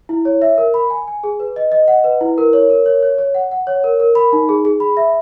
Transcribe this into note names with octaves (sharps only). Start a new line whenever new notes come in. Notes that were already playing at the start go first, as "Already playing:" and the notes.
E4
C#5
E5
A#4
B5
G#5
G#5
G#4
B4
D#5
D#5
F#5
B4
E4
A#4
C#5
A#4
C#5
C#5
C#5
F#5
F#5
C#5
A#4
A#4
B5
D#4
G#4
G#4
B5
E5